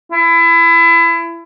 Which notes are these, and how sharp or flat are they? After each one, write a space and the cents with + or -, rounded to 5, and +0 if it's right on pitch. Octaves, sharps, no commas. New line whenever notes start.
E4 +25